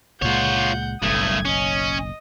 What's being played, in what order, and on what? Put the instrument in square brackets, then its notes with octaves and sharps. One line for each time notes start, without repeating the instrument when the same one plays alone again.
[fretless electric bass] C#2 A#2 G#3 [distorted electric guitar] F4 C#5 [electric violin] F#5 G6
[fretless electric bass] F#1 B1 [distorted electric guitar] G2 A3 [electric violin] D#6 G#6
[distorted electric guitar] C#4 [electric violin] D#5